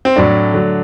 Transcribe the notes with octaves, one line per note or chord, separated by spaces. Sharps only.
C4
A2 F#3 A3 D4
D3 F#3 A3